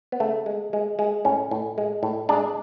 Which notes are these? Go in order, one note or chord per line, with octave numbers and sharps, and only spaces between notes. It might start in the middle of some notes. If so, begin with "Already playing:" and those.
B3
C#3 A3
G#3
G#3
G#3
A2 C#4
A2
G#3
A2
G#3 D4